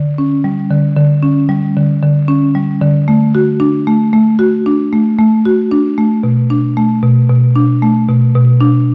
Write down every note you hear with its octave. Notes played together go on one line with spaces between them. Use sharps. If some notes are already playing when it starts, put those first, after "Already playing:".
Already playing: D3
C#4
G3
D3
D3
C#4
G3
D3
D3
C#4
G3
D3
A3
F#4
D4
A3
A3
F#4
D4
A3
A3
F#4
D4
A3
B2
D4
A3
B2
B2
D4
A3
B2
B2
D4